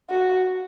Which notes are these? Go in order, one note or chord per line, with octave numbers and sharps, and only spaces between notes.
F#4